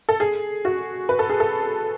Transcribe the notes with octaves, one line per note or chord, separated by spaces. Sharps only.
A4
G#4
F#4
B4
A4
G#4
A4